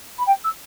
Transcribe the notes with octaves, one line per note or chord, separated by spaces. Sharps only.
B5
G5
E6